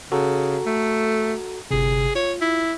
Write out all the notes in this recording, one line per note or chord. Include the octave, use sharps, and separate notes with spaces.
C#3 F#4 A4 A#5
A3
G1 C3 G#4
F4 C#5
E4